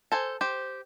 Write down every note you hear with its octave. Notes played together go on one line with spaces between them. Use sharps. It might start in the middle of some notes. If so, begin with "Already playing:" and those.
A4 C5 G#5
G4 C5